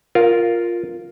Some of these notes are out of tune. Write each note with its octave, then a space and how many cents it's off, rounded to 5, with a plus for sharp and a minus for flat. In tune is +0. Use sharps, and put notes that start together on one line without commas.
F4 +0 A#4 +0